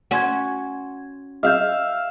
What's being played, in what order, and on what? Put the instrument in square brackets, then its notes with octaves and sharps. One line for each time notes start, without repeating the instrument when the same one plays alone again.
[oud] C#4 F#4 [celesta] F#5 C6 G#6
[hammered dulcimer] E5 F5 [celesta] F6 G6